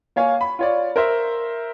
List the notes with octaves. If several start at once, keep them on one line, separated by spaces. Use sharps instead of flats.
A#3 C#5 F5 G#5
B5
F4 C#5 D5
A#4 C5 E5